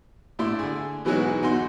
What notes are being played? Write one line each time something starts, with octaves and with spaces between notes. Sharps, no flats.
A2 D4 E4 C6
D3 G#4
B2 E3 F#3 G#3 D#4 F#4
E2 D#4 F#4 C6